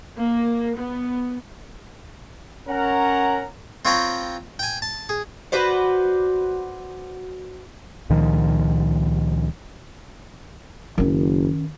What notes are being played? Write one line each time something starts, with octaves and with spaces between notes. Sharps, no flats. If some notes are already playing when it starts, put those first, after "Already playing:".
A#3
B3
C#4 A#4 F#5 A#5
C4 F4 C#5 G5 A#5 B5
G5 G#5
A5
G#4
F#4 B4 C5 D5
C#2 A#2 D#3 F3
F#1 D#3 C#4